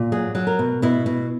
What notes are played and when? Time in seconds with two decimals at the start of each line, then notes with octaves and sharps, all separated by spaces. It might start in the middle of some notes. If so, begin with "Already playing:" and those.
Already playing: A#2
0.12 F#3 G#4
0.35 F#3
0.47 A#4
0.59 B2
0.82 B2 E4
1.06 B2